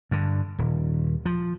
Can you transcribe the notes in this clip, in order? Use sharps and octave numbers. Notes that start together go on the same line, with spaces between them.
G2 D3
D#1
F3